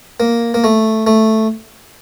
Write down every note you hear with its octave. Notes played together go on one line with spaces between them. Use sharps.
A#3
A#3
A3
A3